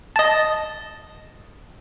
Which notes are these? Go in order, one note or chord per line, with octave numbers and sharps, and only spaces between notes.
D#5 A5